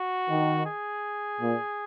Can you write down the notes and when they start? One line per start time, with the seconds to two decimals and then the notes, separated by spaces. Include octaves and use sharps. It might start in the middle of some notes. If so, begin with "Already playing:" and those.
Already playing: F#4
0.28 D#3
0.66 G#4
1.40 A#2